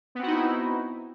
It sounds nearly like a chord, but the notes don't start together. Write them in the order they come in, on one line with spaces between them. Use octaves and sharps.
B3 C4 F#4 D#4 E4